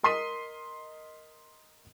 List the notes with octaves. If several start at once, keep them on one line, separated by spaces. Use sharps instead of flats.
A#4 D#5 C6 D#6 B6 D#7